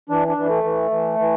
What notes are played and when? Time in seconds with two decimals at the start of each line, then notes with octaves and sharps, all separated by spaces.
0.09 E3 D4
0.28 D4
0.37 E3
0.46 A3
0.64 E3
0.91 E3
1.19 E3